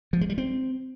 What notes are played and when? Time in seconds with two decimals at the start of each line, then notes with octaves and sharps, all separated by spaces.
0.13 F3
0.21 G#3
0.29 G3
0.38 C4